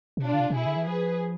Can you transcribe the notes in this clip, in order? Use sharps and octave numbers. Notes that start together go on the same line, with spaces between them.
C3
B2 D4 F4
D3
C3
C3
B2 E4 G#4
D3
E3
F3 G#4 B4